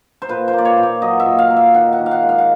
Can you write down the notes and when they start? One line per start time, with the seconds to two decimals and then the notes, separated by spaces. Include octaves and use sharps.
0.22 C5
0.29 A#2 B4
0.48 C5
0.53 A#3
0.58 D5
0.65 C#5
0.78 A#2
0.83 D5
1.02 F#3 D#5
1.20 E5
1.26 A#2
1.39 F5
1.50 A#3
1.56 E5
1.74 D#3 F#5
1.93 F#5
1.98 D#3
2.06 F5
2.11 F#5
2.23 G#3
2.29 F5
2.38 F#5